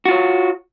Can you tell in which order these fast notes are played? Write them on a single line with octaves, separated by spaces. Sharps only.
F#4 F4 C#5